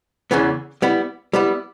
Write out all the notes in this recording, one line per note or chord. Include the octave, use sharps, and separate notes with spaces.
E2 C#3 E3 B3
G3 B3 E4
G3 B3 E4